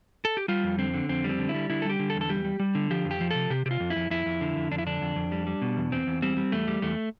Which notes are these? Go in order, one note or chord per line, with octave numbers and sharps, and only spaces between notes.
A4
G4
G3 F4
F2
D3 C4
D3
F2 C4
G3 C4
D3
E4
G3
D3 E4
A4
G3 G4
D3
A4
E2
A4
G3 G4
G3
G3
D3
F3 G4
F2
G4
F3
C3 A4
C3 G4
C3 G4
F4
F2
E4
F2
F2 E4
F2
D3
F2
F2 D4
E4
D3 D4
F2
F2
G3
G3
B2
E2
E2 C4
E2
G3 C4
G3
E2 A3
G3
E2 A3